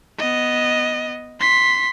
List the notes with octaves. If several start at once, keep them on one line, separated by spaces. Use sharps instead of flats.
B3 D#5
C6 B6